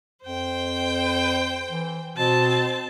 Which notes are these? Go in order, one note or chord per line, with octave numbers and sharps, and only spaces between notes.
F2 C5 G5
E3
B2 C4 A5